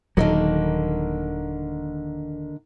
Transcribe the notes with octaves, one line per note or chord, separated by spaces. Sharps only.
D#1 D3 D#3 F#3 A#3